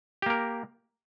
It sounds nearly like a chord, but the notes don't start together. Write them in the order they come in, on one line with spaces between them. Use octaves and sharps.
G4 A#3 A#4